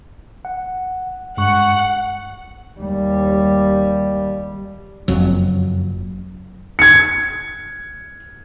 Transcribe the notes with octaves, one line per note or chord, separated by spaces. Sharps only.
F#5
G2 G#3 F#5 C#6
D#2 G3
F#1 F2 F#3
G#6 C#7